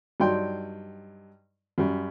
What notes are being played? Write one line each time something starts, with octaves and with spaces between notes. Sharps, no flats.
G2 F#3 D#4 D5 G5 C6
F#2 G3